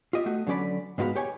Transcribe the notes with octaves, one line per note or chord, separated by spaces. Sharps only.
F4 G4 D#5 E5
A3 F#4
D3 F#3 C#4 D5 B5
G#2 G#3 B3 F#4 F5 B5
G4 C#5 G#5